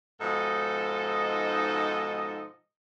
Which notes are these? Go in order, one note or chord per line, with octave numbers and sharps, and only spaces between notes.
G#2 B2 F3 D#4 A4 D#5